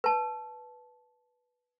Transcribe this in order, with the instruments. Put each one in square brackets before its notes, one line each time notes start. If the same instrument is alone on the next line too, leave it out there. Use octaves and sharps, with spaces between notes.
[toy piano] B4 A5